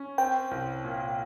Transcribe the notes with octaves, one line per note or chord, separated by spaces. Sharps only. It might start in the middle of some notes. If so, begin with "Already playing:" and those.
Already playing: C#4
C4 G5
C2
A#2